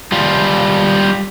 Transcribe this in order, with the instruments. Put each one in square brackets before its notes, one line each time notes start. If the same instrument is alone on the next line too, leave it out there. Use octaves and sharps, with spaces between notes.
[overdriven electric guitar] G3 F4